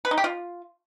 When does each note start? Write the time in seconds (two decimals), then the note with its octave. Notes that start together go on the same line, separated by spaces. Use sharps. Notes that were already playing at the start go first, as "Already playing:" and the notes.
0.05 B4
0.11 D#4
0.18 G4
0.24 F4